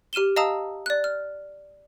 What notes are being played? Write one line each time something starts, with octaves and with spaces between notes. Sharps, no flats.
G4 F6 D#7 E7 G7
D#5 F5 A5 A#5 D#6 E6
D5 F#6
F6